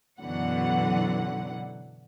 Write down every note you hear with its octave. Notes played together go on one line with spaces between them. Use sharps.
F#2 B2 D3 E3 F#3 F#5